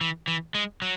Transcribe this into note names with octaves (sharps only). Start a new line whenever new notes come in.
E3
E3
G#3
F#3